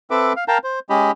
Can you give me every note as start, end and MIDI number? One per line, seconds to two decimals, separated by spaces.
0.11 0.33 60
0.11 0.33 69
0.11 0.33 71
0.11 0.33 76
0.11 0.33 86
0.36 0.44 77
0.48 0.58 70
0.48 0.58 77
0.48 0.58 79
0.48 0.58 81
0.48 0.58 82
0.64 0.79 72
0.90 1.11 56
0.90 1.11 61
0.90 1.11 67
0.90 1.11 75
0.90 1.11 83